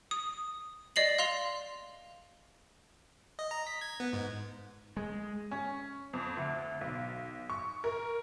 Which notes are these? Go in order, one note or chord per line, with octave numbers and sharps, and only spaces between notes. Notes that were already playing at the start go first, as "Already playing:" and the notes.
D#6
D5 D#5 C7 F#7
F5 C6 F7
D#5
A#5
B6
G#6
B3
G#2
G#3
C#4
F2
D2
B1
C#6
A#4